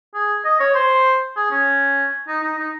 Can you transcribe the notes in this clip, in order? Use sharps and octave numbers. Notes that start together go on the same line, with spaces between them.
G#4
D#5
C#5
C5
G#4
C#4
D#4
D#4
D#4